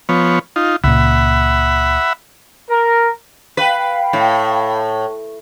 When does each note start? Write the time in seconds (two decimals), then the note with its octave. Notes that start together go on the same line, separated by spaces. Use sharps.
0.09 F3 B3 C#5
0.56 D#4 F4
0.84 C#2 A#2 E5 F#5 B5
2.69 A#4
3.57 B4 F5 G5 B5
4.13 A2